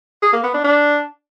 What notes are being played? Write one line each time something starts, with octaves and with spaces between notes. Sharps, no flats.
G#4
A#3
B3
D4
D4